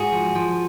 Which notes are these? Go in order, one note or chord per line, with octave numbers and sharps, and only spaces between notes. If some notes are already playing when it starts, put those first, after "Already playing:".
Already playing: G#2 F#4 G#4
F3
F3